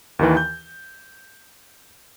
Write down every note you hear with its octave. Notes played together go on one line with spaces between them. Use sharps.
D#2 D#3 E3
G6